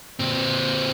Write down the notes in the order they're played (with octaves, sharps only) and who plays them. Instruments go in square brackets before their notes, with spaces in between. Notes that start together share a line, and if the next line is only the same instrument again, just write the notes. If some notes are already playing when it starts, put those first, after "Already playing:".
[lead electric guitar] A#2 C4